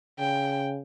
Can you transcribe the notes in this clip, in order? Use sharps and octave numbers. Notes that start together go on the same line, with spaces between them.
C#3 G5